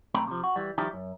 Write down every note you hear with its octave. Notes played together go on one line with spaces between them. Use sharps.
B1 A3 C4 G5 A#5 B5
C3 F3
F#4
E3 G3
D#3 F3 G3 D#4 E4 G4
F#2